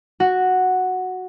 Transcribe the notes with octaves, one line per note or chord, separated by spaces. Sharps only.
F#4